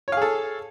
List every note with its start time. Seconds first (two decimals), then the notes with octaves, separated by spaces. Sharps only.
0.08 C#5
0.12 F5
0.17 G#4
0.22 A4